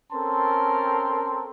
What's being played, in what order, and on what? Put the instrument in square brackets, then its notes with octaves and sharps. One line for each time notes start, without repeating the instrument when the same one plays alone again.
[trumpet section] C4 C#4 A4 A#4 A5 C6